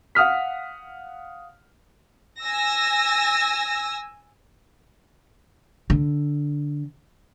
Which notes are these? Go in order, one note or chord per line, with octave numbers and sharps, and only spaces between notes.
F5 F#5 D#6 F6 B6
G#5 E6 A#6
D3